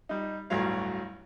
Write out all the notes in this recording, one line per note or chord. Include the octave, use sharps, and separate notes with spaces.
G3 D#4
A1 D2 G2 F#3 C#5 F5